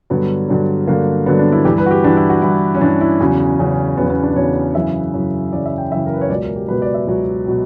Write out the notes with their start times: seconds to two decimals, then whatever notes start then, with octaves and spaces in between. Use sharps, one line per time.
0.10 G2 D3 F#3 B3
0.48 G2 D3 F#3
0.87 G2 D3 F#3 A#3
1.26 G2 D3 F#3 B3
1.39 D4
1.52 E4
1.65 G2 E3 G4
1.78 B4
1.86 F#4
1.91 G4
2.03 G2 E3 D4
2.17 E4
2.30 F#4
2.42 G2 E3 E4
2.75 C#4
2.81 G2 E3 D4
3.01 E4
3.20 E2 C#3 F#3 C#4
3.59 E2 C#3 F#3
3.97 E2 C#3 F#3 B3
4.06 C#4
4.10 B3
4.23 D4
4.36 E2 C#3 F#3 C#5
4.75 F#2 C#3 E3 E5
5.14 F#2 C#3 E3
5.52 F#2 C#3 E3 D5
5.66 E5
5.78 G5
5.91 F#2 C#3 E3 E5
6.06 A#4
6.14 B4
6.21 C#5
6.30 C#2 B2 F#3 D5
6.43 A#4
6.56 G4
6.68 C#2 B2 F#3 B4
6.82 D5
6.94 E5
7.07 C#2 B2 F#3
7.46 B2 F#3